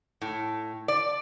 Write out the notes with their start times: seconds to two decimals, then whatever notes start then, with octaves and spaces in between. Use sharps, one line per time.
0.22 A2
0.88 D5